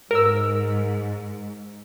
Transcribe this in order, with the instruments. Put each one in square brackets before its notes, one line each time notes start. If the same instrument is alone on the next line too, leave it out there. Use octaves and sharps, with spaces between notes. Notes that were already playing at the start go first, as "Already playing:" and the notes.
[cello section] G#2 [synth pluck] A#4 E6